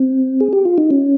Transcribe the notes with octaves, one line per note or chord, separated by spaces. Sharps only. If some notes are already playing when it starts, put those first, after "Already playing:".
Already playing: C4
G#4
G4
F4
D#4
C#4